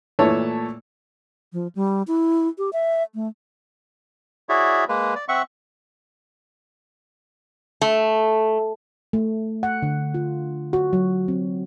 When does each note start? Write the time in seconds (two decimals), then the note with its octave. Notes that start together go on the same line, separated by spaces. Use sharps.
0.19 A#2 E3 A3 C#5 A5
1.52 F3
1.75 G3
2.07 E4
2.58 G4
2.73 E5
3.14 A3
4.49 E4 F#4 G#4 C#5 D5 E5
4.88 G#3 A#3 B4
5.15 D5
5.28 C4 E5 F#5 C#6
7.82 A3
9.13 A3
9.63 F#5
9.82 D3
10.14 F4
10.73 F#4
10.93 F#3
11.28 C4